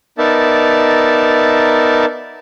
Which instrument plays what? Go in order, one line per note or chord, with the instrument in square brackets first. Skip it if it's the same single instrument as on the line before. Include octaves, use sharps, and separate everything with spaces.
[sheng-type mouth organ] B3 D#4 A#4 D5 E5 A5